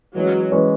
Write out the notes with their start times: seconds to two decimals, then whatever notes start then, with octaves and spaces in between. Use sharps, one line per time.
0.15 E3 F#3 G#3 C#4
0.52 E3 G#3 C#4